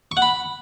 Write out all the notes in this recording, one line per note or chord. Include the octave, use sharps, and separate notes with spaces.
C#6
F#5
B5